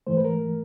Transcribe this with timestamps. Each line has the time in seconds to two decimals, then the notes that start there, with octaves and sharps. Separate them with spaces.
0.07 G#2 E3 A3 C5
0.17 B4
0.25 A#4